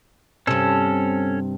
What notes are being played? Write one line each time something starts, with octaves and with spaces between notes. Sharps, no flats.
G2 C3 C#4 A4